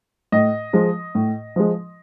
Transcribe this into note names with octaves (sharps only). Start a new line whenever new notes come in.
A2 D#5
F3 G#3
A2
F3 G#3